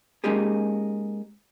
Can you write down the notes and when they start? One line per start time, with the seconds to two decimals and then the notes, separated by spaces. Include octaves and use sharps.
0.24 G#3 A#3 C#4 D#4 G4 G#4